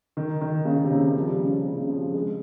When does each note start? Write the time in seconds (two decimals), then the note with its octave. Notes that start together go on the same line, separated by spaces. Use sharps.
0.17 D#3
0.41 D#3
0.65 C#3
0.78 C#3
0.84 C3
0.90 C#3
1.03 D#3
1.15 F3
1.28 G3
1.40 C#3
1.65 C3
1.77 C#3
1.90 F3
2.14 G#3